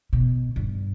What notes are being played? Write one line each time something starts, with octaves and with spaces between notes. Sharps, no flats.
B2
G2